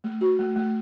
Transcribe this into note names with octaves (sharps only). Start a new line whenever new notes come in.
A3
F#4
A3
A3